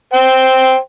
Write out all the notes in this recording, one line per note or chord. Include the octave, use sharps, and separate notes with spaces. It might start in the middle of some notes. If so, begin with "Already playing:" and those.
C5 G5